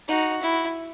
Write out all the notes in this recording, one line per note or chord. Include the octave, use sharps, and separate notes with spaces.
D#4 F#4
E4